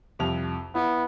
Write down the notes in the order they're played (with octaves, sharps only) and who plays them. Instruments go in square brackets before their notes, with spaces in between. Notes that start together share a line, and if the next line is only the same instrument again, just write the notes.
[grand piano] C2 F2 F7
[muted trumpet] B3 [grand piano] E4